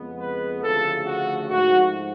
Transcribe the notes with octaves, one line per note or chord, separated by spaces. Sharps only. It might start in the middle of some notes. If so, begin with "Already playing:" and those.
Already playing: F2 C#3 G#3 B3
B4
D2 C#3 F3 A3 A4
F#4
G#2 F3 A3 F#4